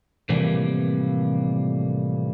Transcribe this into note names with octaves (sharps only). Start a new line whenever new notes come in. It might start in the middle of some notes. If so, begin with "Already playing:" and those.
A2 C3 E3 F3 G3 A#3